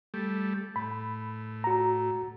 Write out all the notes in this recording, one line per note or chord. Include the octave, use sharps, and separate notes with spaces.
G3 A3
A2 B5
F#4 A#5